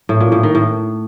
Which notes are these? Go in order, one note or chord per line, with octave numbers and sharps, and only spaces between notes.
A2
A#2
A2
D#3
A2